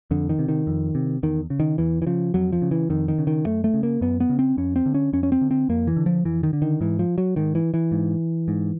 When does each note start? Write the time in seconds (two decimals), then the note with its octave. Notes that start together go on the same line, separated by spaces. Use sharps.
0.11 F2 D3
0.29 D#3
0.39 C3
0.48 D#3
0.67 F2
0.95 C3
1.23 E2 D#3
1.50 C#3
1.60 D#3
1.78 E2 E3
2.02 E3
2.06 C#3 F3
2.34 F2 F#3
2.52 F3
2.62 C#3
2.71 E3
2.90 F2 D#3
3.08 D#3
3.18 C#3
3.27 D#3
3.46 F#2 A3
3.64 A3
3.74 C#3
3.83 A#3
4.01 F#2 B3
4.20 B3
4.29 C#3
4.39 C4
4.57 F2 C#4
4.76 C4
4.86 D3
4.94 C#4
5.13 F2 C#4
5.23 C#4
5.32 C4
5.41 D3
5.51 C4
5.69 F2 A#3
5.87 E3
5.97 D3
6.06 F3
6.25 F2 E3
6.43 D#3
6.53 D3
6.62 D#3
6.81 G#2 E3
6.99 F3
7.18 F#3
7.36 G#2 D#3
7.55 E3
7.74 E3
7.92 G#2
8.48 G#2